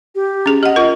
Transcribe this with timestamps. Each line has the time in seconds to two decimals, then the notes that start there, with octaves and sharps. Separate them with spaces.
0.15 G4
0.46 C#4 G#4
0.63 G4 D#5 F#5
0.76 F4 A#4